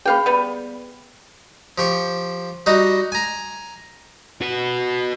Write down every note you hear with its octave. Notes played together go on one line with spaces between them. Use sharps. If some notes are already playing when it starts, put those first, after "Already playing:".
C#4 G#4 B4 F5 G5 B5
G3 B3
F3 G4 C#6
G3 D#4 F#4
G#5 A#5
F#4 B4